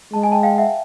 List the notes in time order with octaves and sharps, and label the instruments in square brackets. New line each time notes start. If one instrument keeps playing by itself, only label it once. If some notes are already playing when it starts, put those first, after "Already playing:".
[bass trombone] G#3 [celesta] A5
[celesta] G#5
G5 A5
F5 G5
E5 F#5